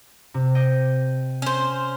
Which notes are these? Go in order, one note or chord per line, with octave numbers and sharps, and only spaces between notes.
C3
D#5 G5
C#4 C5